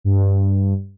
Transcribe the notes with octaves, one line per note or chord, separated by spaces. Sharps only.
G2